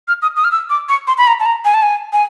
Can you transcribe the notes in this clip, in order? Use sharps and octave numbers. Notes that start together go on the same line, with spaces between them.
F6
D#6
D#6
F6
E6
D6
C#6
C6
B5
A#5
A5
A#5
G#5
A5
G#5
G#5